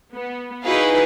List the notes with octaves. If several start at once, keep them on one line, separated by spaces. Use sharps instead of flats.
B3
D#4 E4 F#4 G#4 B4 F5